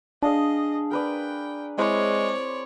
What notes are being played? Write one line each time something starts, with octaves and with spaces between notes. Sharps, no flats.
D4 G#4 D#5 F5 A5
A#4 B4 D5 G5
G#3 C4 E4 C#5 D5